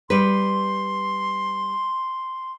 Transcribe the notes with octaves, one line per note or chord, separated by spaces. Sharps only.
G3 B4 C6